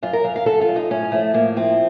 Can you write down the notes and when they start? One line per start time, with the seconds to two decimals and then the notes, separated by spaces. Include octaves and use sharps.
0.03 F#2 F4
0.13 A#4
0.24 F#2 F5
0.36 F5
0.46 F#2 A4
0.61 F4
0.68 F#2
0.76 D#4
0.90 A2 C#4
1.12 F3 A3
1.34 A2 A#3
1.56 F3 C4